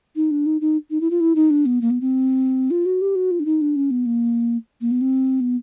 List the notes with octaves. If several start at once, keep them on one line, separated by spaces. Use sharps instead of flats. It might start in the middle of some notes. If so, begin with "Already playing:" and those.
D#4
D4
D#4
D#4
D#4
E4
F4
E4
D#4
D4
B3
A#3
B3
C4
F4
F#4
G4
F#4
F4
D4
D#4
D4
C#4
B3
A#3
A#3
B3
C4
B3